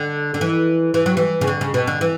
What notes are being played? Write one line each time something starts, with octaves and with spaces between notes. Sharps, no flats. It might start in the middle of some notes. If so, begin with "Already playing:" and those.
Already playing: D3
D3
E3
E3
F#3
E3
C#3
D3
C#3
B2
D3
E3